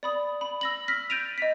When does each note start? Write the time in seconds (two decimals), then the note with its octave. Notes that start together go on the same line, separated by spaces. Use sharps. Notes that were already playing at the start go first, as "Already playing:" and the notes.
0.03 D5 B5 D#6
0.41 B5
0.61 E6 A#6 F#7
0.88 F6 A#6 B6
1.10 G6 A6 D7 D#7 F7
1.38 D#5 B6